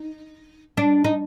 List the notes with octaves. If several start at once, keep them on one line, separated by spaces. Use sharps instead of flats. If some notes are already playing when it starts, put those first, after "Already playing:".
Already playing: D#4
D4
D#4